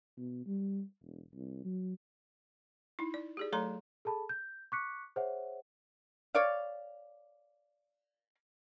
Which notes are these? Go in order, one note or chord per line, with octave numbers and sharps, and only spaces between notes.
B2
G3
E1
C2
F#3
D#4 E4
D5
G4 G#4 D5
F#3 A3 A4 C#5 A#5 C6
G#4 A4 A5 B5
G6
C#6 D6 F#6 B6 C#7
G#4 C5 C#5 E5 F#5
C#5 D5 F5